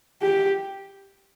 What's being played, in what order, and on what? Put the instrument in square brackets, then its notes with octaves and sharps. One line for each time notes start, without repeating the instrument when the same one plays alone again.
[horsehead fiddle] G4